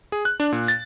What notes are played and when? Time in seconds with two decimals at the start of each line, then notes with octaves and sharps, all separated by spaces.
0.12 G#4
0.25 F#6
0.40 D4
0.52 A#2
0.68 A6